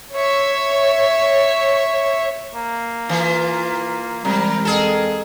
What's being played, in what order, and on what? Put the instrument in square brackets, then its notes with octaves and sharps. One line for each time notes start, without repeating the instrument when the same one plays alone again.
[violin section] C#5 E5
[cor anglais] A#3
[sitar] E3 [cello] F4
[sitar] C3 [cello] E3 G#3 [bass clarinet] G3 [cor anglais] A#4
[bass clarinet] F2 [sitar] G#4 A4